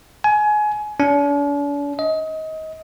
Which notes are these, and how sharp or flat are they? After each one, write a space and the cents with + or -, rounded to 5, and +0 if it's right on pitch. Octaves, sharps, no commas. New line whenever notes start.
G#5 +25
D4 -45
D#5 +25